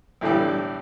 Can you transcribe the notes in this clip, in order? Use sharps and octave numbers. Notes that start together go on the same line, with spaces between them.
B1 A2 D3 E3 G3